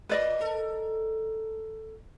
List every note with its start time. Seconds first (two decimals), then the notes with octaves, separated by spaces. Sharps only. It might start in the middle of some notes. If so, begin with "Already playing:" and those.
0.09 A2 B4 D5 D#5
0.41 A4 A#4